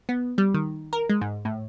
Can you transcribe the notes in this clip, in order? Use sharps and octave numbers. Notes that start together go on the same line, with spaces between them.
B3
G3
D#3
A#4
G#3
G#2
A2